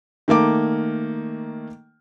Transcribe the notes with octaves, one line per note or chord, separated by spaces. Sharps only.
D#3 A3 A#3 D6